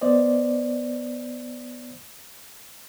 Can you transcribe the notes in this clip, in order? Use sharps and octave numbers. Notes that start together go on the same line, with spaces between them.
B3 C5 D5 D#5